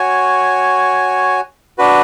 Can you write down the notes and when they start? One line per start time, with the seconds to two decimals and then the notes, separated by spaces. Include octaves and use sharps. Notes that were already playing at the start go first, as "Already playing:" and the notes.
Already playing: F#4 C#5 G#5
1.78 D4 F#4 B4